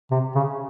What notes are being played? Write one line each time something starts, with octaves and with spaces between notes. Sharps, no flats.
C3
C#3